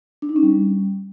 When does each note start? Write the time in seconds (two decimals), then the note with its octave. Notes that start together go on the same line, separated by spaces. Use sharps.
0.22 D4
0.29 D#4
0.36 C#4
0.43 G3